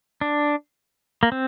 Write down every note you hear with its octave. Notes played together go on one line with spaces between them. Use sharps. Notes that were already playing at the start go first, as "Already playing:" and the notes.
D4
A#3
C4